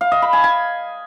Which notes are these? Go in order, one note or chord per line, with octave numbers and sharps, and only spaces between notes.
F5
D#5
B5
G#5
G#5